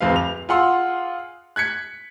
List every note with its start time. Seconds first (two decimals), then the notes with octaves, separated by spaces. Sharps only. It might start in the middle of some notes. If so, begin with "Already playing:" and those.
0.01 D1 F2 C4 B4 F5
0.16 F7
0.49 F4 G#4 F#5 C6 E6
1.56 F#6 G#6 B6 C#7